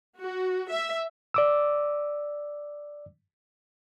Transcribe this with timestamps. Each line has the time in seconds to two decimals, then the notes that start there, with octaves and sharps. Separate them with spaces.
0.19 F#4
0.70 E5
1.34 D5 D6 E6